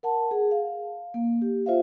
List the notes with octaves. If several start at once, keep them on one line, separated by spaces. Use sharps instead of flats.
A#4 F#5 A5
G#4
F5
A#3
G4
F4 C5 E5 F5